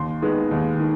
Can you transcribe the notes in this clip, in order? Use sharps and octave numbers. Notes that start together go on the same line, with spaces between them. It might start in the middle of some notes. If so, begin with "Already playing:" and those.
Already playing: D#2 C6
D#3 G#3 B3
D#2
D#3